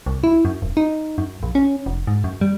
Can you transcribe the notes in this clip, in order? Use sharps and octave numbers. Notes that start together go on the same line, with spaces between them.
C2
E4
F#2
D#1
D#4
F#2
A#1
C#4
F1
G#2
F#2
G3